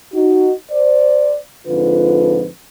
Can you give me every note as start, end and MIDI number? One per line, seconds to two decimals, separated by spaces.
0.14 0.53 63
0.14 0.53 66
0.71 1.36 72
0.71 1.36 74
1.67 2.45 41
1.67 2.45 44
1.67 2.45 50
1.67 2.45 65
1.67 2.45 71